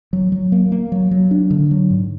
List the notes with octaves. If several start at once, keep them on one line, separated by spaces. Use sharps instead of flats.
F#3
F#3
A#3
A#3
F#3
F#3
D4
D3
F#3
G#2